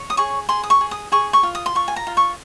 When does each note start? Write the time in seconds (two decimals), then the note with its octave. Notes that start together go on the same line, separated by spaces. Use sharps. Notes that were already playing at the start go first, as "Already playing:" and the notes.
Already playing: C#5
0.10 D#6
0.17 G#4 C#6
0.49 G#4 C6
0.63 D#6
0.70 C#6
0.81 G#4
0.91 D#6
1.12 G#4 C#6
1.33 C#6
1.43 F4
1.55 D#6
1.66 C6
1.75 F4 C#6
1.88 G#5
1.96 A#5
2.07 F4
2.17 C#6